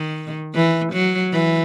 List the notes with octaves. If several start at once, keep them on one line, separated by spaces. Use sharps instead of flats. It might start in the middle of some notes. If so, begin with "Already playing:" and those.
Already playing: D#3
E3
F#3
E3